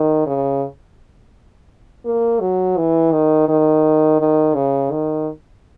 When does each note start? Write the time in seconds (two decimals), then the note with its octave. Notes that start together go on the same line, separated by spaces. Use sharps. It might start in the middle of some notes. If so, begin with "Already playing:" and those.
Already playing: D#3
0.26 C#3
2.05 A#3
2.40 F#3
2.77 E3
3.12 D#3
3.48 D#3
4.20 D#3
4.55 C#3
4.91 D#3